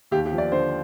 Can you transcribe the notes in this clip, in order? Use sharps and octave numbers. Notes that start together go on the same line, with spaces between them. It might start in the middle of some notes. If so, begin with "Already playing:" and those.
D#2 G4
G4
F3
D5
D3 C5